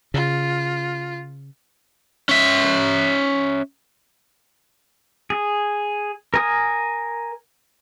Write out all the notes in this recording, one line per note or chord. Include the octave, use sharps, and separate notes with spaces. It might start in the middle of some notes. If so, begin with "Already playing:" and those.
C#3 F4
C#4 E5
G#4
A#4 G#5 D#6